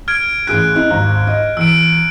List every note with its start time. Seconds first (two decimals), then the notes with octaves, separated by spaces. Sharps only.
0.08 F6 G#6 D7
0.47 A1 G#4 F#6 D7
0.74 C4 D#4 E4
0.90 G#1 D#2 A#5
1.27 D#5
1.57 E2 E6 D7